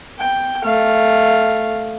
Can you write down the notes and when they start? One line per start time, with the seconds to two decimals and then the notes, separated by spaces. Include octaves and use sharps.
0.19 G5
0.64 A3 F5